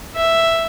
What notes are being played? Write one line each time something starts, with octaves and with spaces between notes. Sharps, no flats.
E5